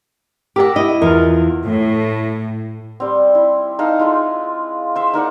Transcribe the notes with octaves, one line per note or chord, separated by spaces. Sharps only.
G4 A#4 F#5 D6 E6 A#6
E4 D#5
E2 F4 A#4
A2
G3 C4
E4
D#4 A4 F5
G#3 E4 F4
C5 E5
D#4 A#4 D5 F#5